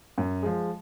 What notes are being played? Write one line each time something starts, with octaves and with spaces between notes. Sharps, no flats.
F#2
F3 G#3